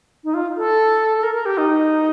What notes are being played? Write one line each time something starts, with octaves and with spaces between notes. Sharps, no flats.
D#4
F4
A4
A4
A#4
A#4
G4
D#4